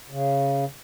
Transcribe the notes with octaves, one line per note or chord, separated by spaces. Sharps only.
C#3